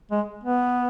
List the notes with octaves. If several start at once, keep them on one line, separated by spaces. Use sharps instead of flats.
G#3
B3